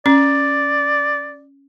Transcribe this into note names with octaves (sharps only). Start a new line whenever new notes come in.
C#4 D5